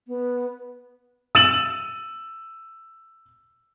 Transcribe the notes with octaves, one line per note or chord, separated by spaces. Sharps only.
B3
E6 A6 D#7 E7 F#7